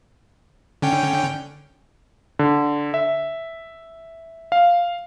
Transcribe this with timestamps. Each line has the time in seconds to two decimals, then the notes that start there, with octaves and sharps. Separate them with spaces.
0.82 D3 C#4 G5
2.39 D3
2.94 E5
4.52 F5